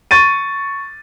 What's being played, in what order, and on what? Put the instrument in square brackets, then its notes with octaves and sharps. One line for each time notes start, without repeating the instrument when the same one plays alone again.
[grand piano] C#6 A6 D#7